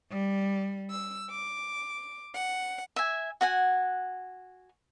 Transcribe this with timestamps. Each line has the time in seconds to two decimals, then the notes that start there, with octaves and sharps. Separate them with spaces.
0.11 G3
0.91 E6
1.30 D6
2.34 F#5
2.96 E5 G#5
3.41 F#4 F#5 G#5